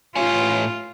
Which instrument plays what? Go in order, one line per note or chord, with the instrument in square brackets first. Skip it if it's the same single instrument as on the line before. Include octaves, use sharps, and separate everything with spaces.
[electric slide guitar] A2 C#5 G#5 [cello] F4